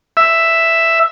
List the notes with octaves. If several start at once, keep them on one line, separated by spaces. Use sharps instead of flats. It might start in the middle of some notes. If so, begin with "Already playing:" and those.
E5